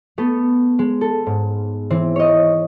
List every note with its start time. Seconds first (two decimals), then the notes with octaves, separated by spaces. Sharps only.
0.18 A3 B3 A4
0.79 G#3
1.01 A4
1.27 G#2
1.90 E3 C4
2.16 C#5 D#5